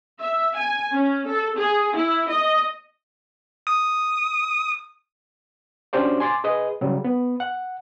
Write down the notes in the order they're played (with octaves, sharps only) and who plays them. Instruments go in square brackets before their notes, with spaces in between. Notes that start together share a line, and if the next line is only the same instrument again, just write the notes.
[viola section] E5
G#5
C#4
A4
G#4
E4
D#5
[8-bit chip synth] D#6
[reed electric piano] C#4 D4 F#4 G4 C5 D5
G#5 C6 D6 A6
G#4 B4 D#5
C#3 F#3 G3
B3
F#5